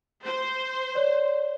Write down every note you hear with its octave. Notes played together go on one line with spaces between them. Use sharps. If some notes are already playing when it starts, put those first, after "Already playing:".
C5
C#5 D5